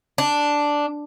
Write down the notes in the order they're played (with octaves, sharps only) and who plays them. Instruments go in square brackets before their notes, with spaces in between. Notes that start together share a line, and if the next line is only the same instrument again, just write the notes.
[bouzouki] D4